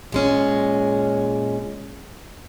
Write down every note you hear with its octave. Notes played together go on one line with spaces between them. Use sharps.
A#2 G#3 C#4